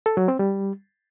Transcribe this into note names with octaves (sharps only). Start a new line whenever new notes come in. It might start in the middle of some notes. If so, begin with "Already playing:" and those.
A4
F#3
C4
G3